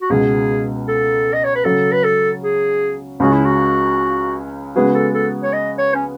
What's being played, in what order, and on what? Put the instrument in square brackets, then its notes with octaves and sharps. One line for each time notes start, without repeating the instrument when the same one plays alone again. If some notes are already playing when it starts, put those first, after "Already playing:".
[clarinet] F#4
[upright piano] C#2 B2 G#3 [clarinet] G#4
[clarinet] A4
D#5
C#5
B4
[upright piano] C#3 F#3 C#4 [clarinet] A4
[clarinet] B4
A4
G#4
[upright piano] C#2 C#3 G#3 C#4 G#4 [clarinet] F#4
[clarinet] E4
F#4
[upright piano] C#3 G#3 B3 F#4 [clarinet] G#4
[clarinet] A4
A4
C#5
D#5
C#5
C#4